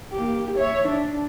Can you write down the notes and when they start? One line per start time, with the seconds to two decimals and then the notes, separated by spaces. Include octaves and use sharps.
0.13 A#3 G4
0.58 C#5 E5
0.88 D4